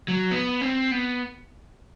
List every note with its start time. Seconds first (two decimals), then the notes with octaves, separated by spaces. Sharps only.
0.08 F#3
0.31 B3
0.61 C4
0.91 B3